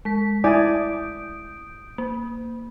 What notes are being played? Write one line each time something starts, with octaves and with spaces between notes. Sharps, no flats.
G#3 B6
E4 D5 G#5 D#6 G6 D7
A#3